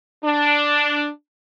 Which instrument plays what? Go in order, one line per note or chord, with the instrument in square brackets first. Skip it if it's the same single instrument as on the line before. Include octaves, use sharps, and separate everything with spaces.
[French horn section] D4